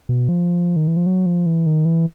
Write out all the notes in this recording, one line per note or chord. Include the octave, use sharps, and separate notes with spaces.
B2
F3
D#3
E3
F3
F#3
F3
E3
D#3
E3